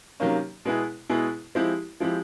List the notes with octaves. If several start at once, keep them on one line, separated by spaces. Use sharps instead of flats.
C3 D#3 F#3 A#3 C#4
B2 G#3 B3 E4 G#4
B2 G#3 B3 E4 G#4
F3 G#3 C4 E4 G4
F3 G#3 C4 E4 G4